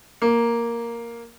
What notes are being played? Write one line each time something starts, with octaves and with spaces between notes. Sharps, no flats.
A#3